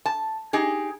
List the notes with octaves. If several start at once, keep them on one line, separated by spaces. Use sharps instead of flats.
A5
D#4 G4 G#4